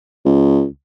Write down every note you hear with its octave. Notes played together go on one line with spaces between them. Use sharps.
C#2